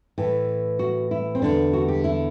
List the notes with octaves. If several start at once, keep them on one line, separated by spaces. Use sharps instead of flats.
A2 E3
F#4
E4
C4
E2 D3 D4
F#4
G4
E4